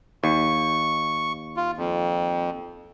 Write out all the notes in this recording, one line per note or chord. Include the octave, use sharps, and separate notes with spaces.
D#2 C#6
F4
F2